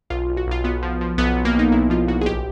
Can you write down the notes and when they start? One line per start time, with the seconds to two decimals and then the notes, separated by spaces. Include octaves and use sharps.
0.10 B1 F4
0.29 B1
0.37 F#4
0.47 B1 F4
0.64 B1 B3
0.83 F3
1.01 F3
1.18 B1 B3
1.37 B1
1.45 A#3
1.55 B1 D#4
1.72 B1 E4
1.90 F3 F4
2.08 B1 F#4
2.21 G#4
2.26 A1 G4